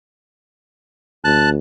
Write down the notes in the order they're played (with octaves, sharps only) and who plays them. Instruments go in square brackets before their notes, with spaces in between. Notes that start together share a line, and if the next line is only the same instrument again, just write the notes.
[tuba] D2 [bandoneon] A5 F#6